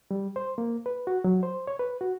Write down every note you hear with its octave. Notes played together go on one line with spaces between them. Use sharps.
G3
C5
A#3
B4
F#4
F#3
C5
C#5
B4
F#4